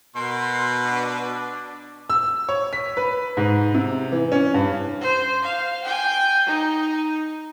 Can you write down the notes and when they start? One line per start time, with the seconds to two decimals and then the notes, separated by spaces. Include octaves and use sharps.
0.16 B2 A#4 C6
0.84 D4
2.10 E6
2.49 C#5
2.73 B6
2.97 B4
3.37 G#2
3.74 C3
4.12 E3
4.32 C#4
4.54 G2
5.01 C5
5.42 F5
5.84 G5 G#5
6.46 D#4